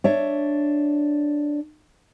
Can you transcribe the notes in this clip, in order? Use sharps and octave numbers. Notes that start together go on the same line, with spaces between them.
D4 C#5 E5